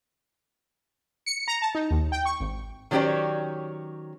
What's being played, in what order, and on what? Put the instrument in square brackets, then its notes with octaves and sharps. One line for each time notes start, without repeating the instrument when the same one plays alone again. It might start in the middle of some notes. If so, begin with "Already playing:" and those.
[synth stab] C#7
A#5
A5
D#4
D#2
G5
C#6
G#1
[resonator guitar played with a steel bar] D#3 F#3 C#4 G4 C5 D5